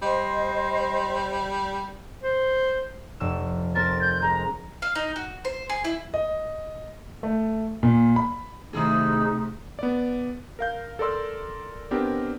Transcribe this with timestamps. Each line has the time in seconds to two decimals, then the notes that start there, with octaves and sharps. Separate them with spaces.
0.02 G3 C5 D#5
2.23 C5
3.20 F1 E6
3.75 C4 A4 A#4 A6
4.02 G6
4.22 G#3 A#5
4.82 F5
4.95 D#4
5.16 F#4
5.45 C5
5.69 G#4
5.84 E4
6.14 D#5
7.23 A3
7.83 A#2
8.16 B5
8.73 C3 D#3 A3 D#4 E4 G#4
9.79 B3 D5
10.59 A#4 F5 G6
10.99 A4 A#4 D5 C6 E6
11.91 B3 C4 D4 G4 A#4